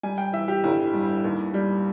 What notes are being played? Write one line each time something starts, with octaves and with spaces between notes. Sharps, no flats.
G3 G#5
G5
E3 E5
G4
G1 E4
G2
D#2
G3